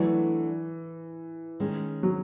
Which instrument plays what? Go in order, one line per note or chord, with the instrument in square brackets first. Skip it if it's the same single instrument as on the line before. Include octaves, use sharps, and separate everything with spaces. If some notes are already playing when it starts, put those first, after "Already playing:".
Already playing: [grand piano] E3 [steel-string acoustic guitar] F#3 A3 D4
[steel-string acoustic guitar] D#3 G#3 C#4
[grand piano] F#3